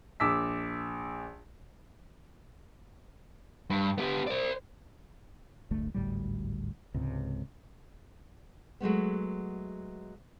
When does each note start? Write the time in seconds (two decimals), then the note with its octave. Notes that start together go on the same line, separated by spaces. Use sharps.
0.20 A#1 D6 E6 B6
3.70 G2
3.98 B3 G4
4.27 C5 D5
5.71 D1 G1 D2 A3
5.94 G#1 D2 A2 G3
6.94 C#2 G#2 C3
8.80 F#3 G#3 A3 B3